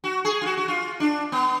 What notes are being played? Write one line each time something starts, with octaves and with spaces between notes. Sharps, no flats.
F#4
G#4
F4
F#4
F#4
F4
D4
B3